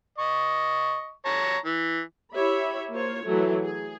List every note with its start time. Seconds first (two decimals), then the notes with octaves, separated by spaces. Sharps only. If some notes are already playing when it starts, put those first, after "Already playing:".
0.18 D#5 C#6
1.25 C#5 A5 A#5
1.66 E3
2.33 E4 G4 C#5 E5 B5
2.91 A#3 F4 C5 C#5
3.23 E3 F#3 A3
3.62 G#4